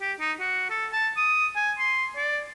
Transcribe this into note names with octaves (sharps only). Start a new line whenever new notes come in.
G4
D#4
F#4
A4
A5
D#6
G#5
C6
D5